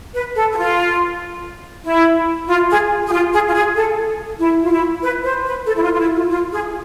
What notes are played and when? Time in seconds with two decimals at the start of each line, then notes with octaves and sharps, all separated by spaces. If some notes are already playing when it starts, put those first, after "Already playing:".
0.14 B4
0.35 A4
0.52 G#4
0.57 F4
1.84 E4
2.48 F4
2.69 G#4
3.07 G#4
3.12 F4
3.33 G#4
3.48 F4
3.54 G#4
3.75 A4
4.39 E4
4.64 F4
4.70 E4
5.03 B4
5.24 C5
5.45 B4
5.66 A4
5.76 E4
5.82 F4
5.94 F4
5.98 E4
6.14 F4
6.30 F4
6.51 G#4